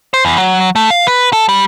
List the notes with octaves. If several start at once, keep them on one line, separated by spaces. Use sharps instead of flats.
C5
E2
F#3
A3
F5
B4
A4
G3